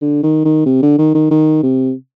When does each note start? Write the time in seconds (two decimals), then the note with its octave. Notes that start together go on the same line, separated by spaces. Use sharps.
0.01 D3
0.23 D#3
0.45 D#3
0.66 C3
0.82 D3
0.98 D#3
1.15 D#3
1.31 D#3
1.63 C3